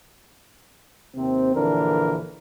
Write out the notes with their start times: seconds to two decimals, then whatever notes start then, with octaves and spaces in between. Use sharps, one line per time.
1.15 D#2 C3 C4
1.55 A#1 D3 E3 D4 A#4